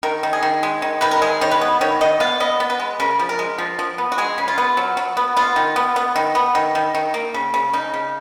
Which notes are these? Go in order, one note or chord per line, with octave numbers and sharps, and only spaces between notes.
D#3 A#4
D#3
G#4
D#3
G#3
D#3
D#3 B4
A#4
G#3 G#4
D#3 C#5
B4
B3
D#3 C#5
D#3 D#5
B3 F5
B3 D#5
B3
B4
G#3
C#3 A#4
F3
A#4
G#3
F3
F3
B3
F#4
G#3 G#4
C#3
F4
B3
F#3
F#3
B3
B3 F4
D#3
B3
B3
D#3
B3
D#3
D#3
D#3
A#3
C#3
C#3
C#3 D#4
C#3